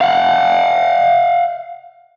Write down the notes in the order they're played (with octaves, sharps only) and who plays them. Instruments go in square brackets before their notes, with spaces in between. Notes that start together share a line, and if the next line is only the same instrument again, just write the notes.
[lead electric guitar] F5 F#5